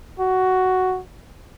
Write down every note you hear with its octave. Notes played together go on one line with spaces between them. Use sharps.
F#4